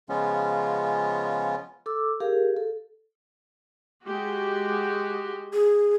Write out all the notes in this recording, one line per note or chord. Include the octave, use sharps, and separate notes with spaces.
C#3 F3 G#3 B3 C#4 F4
A4 D6 E6
G4 G#4 A#4 F5
A4
G#3 F#4 G4
G#4